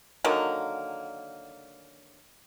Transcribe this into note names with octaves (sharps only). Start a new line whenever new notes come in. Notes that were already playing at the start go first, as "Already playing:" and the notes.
D3 D#3 F#3 A#3